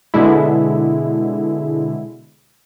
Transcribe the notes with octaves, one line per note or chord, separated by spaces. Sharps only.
B2 D3 G#3 E4